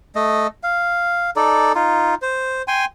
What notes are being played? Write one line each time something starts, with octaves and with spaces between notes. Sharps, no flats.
A3 D#5
F5
D#4 A4 D5
D#4 F4
C5
G5 G#5 C6